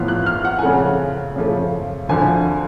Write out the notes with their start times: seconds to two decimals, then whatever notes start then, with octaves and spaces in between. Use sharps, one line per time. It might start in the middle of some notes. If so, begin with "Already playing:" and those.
Already playing: A2 F3 B3 F4 F6
0.08 F#6
0.26 F6
0.45 F#5
0.59 G#5
0.63 C#3 F3 A3 F#5
1.36 C#3 F3 A3
2.09 D2 D3 F3 G#5